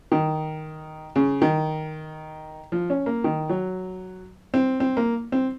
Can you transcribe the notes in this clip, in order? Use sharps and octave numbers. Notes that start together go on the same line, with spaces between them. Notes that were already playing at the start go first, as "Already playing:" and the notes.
D#3
C#3
D#3
F3
C#4
A#3
D#3
F#3
C4
C4
A#3
C4